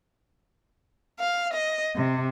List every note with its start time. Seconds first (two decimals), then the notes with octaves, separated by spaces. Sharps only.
1.20 F5
1.54 D#5
1.96 C3